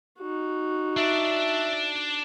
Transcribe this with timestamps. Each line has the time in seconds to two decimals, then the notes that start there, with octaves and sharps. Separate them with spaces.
0.19 D#4 F#4
0.97 D4 D5 E5